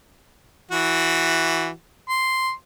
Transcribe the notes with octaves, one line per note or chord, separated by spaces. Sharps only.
E3 F#4
C6